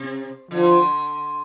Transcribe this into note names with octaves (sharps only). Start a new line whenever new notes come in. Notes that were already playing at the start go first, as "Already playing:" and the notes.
Already playing: C3
D3 F3